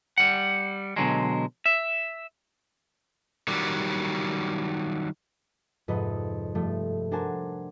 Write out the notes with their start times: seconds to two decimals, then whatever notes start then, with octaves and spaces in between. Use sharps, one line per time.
0.18 G3 F#5
0.96 B2 D3 F#3 G#3
1.66 E5
3.48 D#3 F#3 G3
5.88 F2 G#2 C3 B4 D#5
6.55 G2 F3 A3 F4
7.11 D4 F#4 A#4 C5 G#5 A5